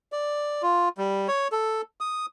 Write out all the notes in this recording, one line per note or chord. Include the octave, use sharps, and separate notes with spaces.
D5
F4
G3
C#5
A4
D#6